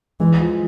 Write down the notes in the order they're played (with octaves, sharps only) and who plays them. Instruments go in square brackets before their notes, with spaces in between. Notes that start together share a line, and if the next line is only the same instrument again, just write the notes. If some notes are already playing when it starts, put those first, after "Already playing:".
[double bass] E3 [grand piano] G#3
[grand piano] F3